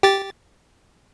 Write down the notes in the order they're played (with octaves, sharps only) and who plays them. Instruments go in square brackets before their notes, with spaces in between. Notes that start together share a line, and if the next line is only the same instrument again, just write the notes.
[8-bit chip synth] G4 A6